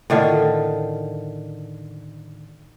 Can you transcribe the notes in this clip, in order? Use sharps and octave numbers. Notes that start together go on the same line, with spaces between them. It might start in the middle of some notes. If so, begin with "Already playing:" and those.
A2 D3 D#3 F4